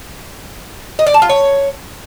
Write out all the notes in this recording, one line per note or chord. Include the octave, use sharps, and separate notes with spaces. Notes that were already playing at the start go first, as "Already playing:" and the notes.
D#5
D5
A5
F4
C#5